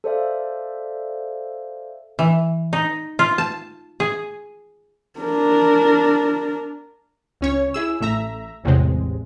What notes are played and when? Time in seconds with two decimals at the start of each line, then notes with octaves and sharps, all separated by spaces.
0.04 A4 C5 D5 E5 F5
2.19 E3
2.73 D#4
3.19 F4
3.38 A5
4.00 G#4
5.19 D4 A#4
7.41 C#2 C#4 C#5
7.74 E4 G#4 E6
8.01 A1 A3 E5 A#5
8.64 A1 E2 A2 C3 G#3